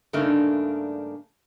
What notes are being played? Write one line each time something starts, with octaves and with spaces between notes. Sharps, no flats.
G2 C#3 A3 A#3 D4 D#4